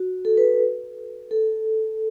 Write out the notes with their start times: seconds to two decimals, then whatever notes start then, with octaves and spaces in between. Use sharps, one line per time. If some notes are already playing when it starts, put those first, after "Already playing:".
Already playing: F#4
0.25 A4
0.37 B4
1.31 A4